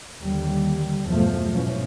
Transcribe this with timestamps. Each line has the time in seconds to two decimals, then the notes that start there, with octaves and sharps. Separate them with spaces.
0.23 D#2 D3 G3
1.06 B1 E2 G2 F3 F#3 A3
1.53 G#2 B2 E3 F3 C#4